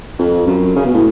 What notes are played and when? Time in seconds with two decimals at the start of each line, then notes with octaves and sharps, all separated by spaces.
0.19 F2
0.47 F#2
0.76 C#3
0.85 B2
0.94 A2